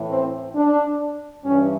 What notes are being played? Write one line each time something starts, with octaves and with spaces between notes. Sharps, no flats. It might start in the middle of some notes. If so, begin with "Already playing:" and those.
Already playing: A2 E3
C4
D4
G2 E3 C#4